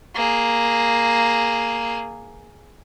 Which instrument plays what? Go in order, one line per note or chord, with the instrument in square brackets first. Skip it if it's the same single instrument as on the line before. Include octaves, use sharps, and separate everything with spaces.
[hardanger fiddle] A#3 G#4